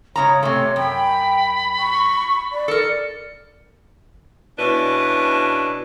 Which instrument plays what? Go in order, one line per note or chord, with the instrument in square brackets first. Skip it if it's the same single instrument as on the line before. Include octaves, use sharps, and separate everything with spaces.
[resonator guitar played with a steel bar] G#2 C#3 A#5 [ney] C#5
[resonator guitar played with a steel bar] C3 A3 [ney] C#5 [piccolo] C6
[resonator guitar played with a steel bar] F#2 [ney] G5 [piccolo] B5
[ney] C#6
D5
[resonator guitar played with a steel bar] A4 A#4 [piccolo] C#7
[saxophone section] B2 C#4 D4 E4 B4